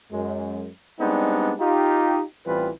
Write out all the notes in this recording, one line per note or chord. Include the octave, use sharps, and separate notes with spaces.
F#2 G#3
G3 G#3 B3 C4 D4 D#4
D#4 F4 G4
A1 E3 G3 C4 F4 B4